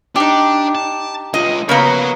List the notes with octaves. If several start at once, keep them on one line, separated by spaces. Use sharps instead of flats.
D4 D#4 G4
A5
G#3 F4 D#5
C#3 A#3 B3 C#5 A#5